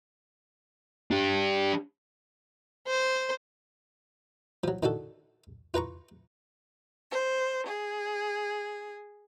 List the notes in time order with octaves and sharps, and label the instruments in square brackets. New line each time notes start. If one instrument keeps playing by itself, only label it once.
[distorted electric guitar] D4 G4
[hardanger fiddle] C5
[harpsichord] F3 F#3
D#3 D4 F#4 A4
F4 B4 A#5 C#6
[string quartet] C5
G#4